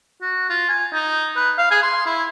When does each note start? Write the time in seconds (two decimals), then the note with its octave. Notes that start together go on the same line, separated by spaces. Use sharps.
0.21 F#4
0.49 F4
0.69 G#5
0.92 D#4
1.36 B4
1.58 F5
1.71 G#4
1.83 C6
2.06 E4